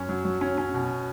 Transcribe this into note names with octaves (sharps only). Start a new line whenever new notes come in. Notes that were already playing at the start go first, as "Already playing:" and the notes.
Already playing: F#2 C#4
F#3
F#3
C#4
C#4
B2